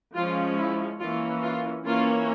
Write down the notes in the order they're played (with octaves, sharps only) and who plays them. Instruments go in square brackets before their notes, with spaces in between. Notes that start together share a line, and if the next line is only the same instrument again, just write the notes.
[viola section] F3 G#3 C#4 F4
E4
E3 A#3 C#4 F4
F4
E3 A#3 C#4 F4